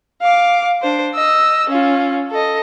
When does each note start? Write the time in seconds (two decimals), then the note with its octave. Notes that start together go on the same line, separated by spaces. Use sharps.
0.22 F5 D6
0.82 D4 C5
1.14 D#5 E6
1.70 C#4 F4
2.30 A4 D#5